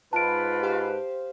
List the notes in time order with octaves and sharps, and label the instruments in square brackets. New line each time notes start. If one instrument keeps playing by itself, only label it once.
[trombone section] G#2 B4 [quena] F4 [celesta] A5 D7
[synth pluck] G4 C5 F5